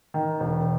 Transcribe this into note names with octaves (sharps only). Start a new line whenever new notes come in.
D#3
E1